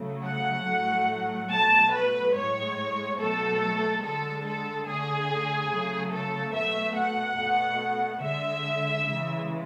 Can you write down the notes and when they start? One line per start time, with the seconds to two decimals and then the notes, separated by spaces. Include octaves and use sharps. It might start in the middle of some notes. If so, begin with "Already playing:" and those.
Already playing: C#3 F#3 A3
0.26 F#5
0.67 A2 F#3 A3
1.51 B2 F#3 A3 A5
1.93 B4
2.35 A2 G#3 C#5
3.19 B2 F#3 A3 A4
4.03 D3 G#3 A4
4.45 A4
4.87 D3 A3 G#4
5.71 C#3 F#3 A3
6.12 A4
6.54 B2 A3 E5
6.96 F#5
7.38 B2 A3
8.22 D3 G#3 E5
9.06 C#3 E3 G#3